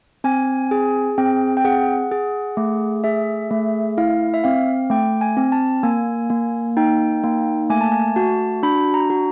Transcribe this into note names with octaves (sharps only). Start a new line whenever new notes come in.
C4 G#5
G#4
C4 G5
G5
G#4 F#5
G#4
A3
G#4 E5
A3
E4 F5
E5
C4 F5
A3 G5
G#5
C4
A5
A#3 G#5
A#3
D#4 G5
A#3
A3 G#5
A5
G#5
F#4 A5
D4 B5
A#5
F#4